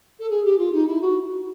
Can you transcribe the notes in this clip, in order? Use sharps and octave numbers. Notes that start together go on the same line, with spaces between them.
A4
G#4
G4
F4
D#4
E4
F#4